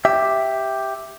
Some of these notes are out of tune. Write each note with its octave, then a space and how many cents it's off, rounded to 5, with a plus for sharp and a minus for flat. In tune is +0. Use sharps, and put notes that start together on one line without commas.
G4 +0 E5 +0